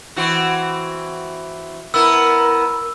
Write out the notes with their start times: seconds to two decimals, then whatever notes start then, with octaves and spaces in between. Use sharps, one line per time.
0.16 E3 C4 F#4
1.94 B3 E4 A#4 E6